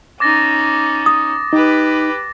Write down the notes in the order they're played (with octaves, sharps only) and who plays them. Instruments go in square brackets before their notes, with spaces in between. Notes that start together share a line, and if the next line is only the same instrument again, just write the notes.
[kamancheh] C#4 D#4 [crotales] D6 A6 A#6
[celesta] D#6
[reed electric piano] D#4 [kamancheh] G4 B4